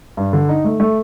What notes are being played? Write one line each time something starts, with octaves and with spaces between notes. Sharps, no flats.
G2
D3
D#4
A3
A3